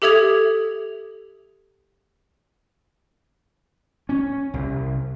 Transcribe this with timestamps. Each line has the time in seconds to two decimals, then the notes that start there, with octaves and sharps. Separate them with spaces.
0.02 G4 A4 E5 D#6 G#6 F7
4.09 C#4
4.54 C2